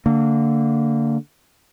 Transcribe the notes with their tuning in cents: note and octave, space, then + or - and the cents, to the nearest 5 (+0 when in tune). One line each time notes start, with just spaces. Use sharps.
D3 -5 A#3 -25